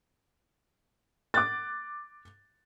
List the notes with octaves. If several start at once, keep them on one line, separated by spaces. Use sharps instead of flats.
D6 F#6 A6